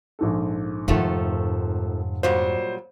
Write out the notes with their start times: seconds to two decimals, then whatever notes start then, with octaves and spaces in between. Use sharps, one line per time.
0.19 A#1 G#2 A4
0.88 F1 F2 G#2 D#3 F3 A3 F4 F#5
2.23 A#2 F#3 G3 C5